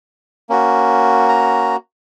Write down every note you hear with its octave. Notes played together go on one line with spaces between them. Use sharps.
A#3 C#4 F#4
A#5